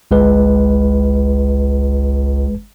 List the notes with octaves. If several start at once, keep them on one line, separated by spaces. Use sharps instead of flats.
G1 C#2 G#3 B4